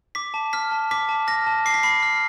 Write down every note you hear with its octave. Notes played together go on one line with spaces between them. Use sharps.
D6 B6
A5
F6 B6
A5
D6 B6
A5
F6 A#6
A5
D6 C7
B6
B5 C7
F6